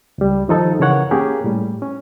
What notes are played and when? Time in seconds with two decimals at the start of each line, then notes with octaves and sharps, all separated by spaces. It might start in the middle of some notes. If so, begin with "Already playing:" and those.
0.18 C#2 G3
0.48 D#3 F3 D#4 A4
0.80 C#3 E3 A#4 C#5 F#5 C#6
1.11 A#3 C#4 G4 G#4 A#4
1.44 A2 G3
1.82 C#4